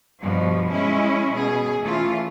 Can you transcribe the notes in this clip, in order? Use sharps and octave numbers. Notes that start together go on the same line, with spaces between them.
G2 B2 F3
G#3 C#4 E4
B2 G#4
E3 A3 C#4 F4